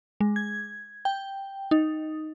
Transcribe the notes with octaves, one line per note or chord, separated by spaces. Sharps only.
G#3
G#6
G5
D#4